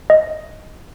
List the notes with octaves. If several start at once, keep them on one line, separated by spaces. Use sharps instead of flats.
D#5